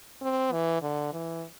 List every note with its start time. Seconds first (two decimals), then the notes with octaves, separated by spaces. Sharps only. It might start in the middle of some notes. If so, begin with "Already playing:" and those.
0.22 C4
0.52 E3
0.82 D3
1.13 E3